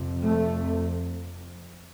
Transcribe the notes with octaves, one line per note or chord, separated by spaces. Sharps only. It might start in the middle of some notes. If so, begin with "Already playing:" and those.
Already playing: F2 C3
A3